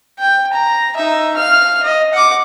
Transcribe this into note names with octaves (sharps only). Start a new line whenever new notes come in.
G5
A#5
D#4 E5
F5 F6
D#5
F#5 D6